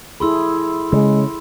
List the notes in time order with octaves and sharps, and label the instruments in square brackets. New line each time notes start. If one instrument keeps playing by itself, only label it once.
[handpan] E4 G#4 A4 [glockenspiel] B5 C6 E6
[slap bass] C#3 [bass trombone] G#3